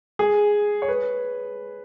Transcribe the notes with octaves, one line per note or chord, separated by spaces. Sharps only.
G#4
C#5
B4